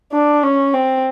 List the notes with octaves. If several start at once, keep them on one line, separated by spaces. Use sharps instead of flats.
D4
C#4
C4